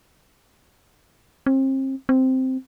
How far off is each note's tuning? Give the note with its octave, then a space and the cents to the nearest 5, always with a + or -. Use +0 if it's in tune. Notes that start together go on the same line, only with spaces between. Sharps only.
C4 +35
C4 -5